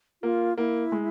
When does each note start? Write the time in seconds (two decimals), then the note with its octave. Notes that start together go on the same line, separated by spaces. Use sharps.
0.23 A#3 F4
0.57 A#3 E4
0.92 G#3